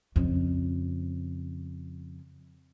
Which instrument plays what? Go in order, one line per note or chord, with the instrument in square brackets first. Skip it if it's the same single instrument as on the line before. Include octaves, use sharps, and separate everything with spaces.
[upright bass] F2 C#3